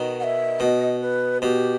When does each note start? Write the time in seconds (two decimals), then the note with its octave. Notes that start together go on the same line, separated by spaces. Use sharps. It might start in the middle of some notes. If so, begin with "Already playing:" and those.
Already playing: B2 D#3
0.20 F#5
0.24 E5
0.60 B2 D#5
1.01 B4
1.42 B2 G4